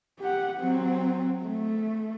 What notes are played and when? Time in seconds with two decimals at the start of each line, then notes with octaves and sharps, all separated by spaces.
0.19 G4 F#5
0.59 F#3 C4
1.44 A3